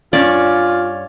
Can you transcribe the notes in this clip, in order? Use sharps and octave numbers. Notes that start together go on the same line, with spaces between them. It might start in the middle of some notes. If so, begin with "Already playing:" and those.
G2 C#4 F4 D5